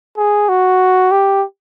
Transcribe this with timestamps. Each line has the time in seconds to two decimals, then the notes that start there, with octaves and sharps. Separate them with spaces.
0.17 G#4
0.49 F#4
1.11 G4